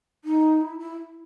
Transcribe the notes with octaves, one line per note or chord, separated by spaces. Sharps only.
D#4
E4
E4